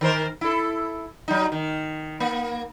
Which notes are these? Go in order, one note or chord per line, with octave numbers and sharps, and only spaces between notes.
D#3 A#4 C5
E4 A4
F#3 D#4
D#3
A#3